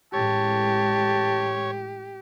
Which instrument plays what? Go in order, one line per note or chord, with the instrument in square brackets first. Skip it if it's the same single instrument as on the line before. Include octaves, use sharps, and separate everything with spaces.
[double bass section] A1 A2 G#3 [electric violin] G4 [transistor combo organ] C#5 [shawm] A5